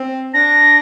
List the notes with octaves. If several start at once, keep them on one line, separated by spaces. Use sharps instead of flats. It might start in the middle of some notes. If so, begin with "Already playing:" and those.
Already playing: C4
D4 A#6